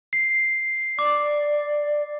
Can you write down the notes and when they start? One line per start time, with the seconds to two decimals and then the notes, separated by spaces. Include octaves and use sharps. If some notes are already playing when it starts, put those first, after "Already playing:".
0.13 C7
0.99 D5 D6